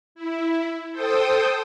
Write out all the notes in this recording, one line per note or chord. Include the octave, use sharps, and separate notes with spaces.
E4
A4 C5 G5 D#6